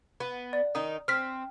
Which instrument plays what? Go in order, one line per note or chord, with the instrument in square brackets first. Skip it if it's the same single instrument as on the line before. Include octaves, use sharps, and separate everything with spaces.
[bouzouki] B3
[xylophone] D5
[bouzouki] D#3 D#4 [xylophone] D#6
[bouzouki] C4 [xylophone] F6 B6